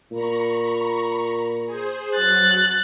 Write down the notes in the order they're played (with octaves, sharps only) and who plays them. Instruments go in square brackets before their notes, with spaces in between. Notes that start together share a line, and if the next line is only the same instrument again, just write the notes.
[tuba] A#2 [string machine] A#5 B5 C#6
[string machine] G#4 C5
[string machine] F#3 [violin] F#6 A6